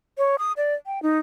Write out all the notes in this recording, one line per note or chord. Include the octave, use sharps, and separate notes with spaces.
C#5
D#6
D5
G5
D#4